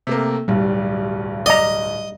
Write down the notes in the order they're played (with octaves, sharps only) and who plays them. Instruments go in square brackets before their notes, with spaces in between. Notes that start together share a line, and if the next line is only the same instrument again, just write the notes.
[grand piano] C3 A3 A#3
[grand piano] D1 B1 [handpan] G3
[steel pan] D5 A#5 [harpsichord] D#5